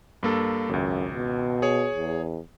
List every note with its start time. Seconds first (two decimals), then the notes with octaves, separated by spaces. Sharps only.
0.23 G2 A#3 A4
0.69 G#1 C#2 F#2
1.14 B2
1.62 G#4 C#5
1.94 E2